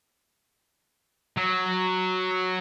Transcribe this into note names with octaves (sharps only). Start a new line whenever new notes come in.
F#3